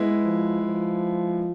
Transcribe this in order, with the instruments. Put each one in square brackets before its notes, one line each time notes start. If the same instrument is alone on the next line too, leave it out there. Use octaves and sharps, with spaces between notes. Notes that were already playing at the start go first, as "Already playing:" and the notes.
Already playing: [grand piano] G#3 B3 E4
[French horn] F3
F3